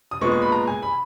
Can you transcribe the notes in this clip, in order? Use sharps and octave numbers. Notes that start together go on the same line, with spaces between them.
D#6
A#2 G#3 B3 C#6
C#6
B5
A#5
G#5
B5